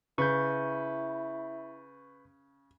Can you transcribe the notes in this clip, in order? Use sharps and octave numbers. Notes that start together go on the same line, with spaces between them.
C#3 E4 B4 C#6 G6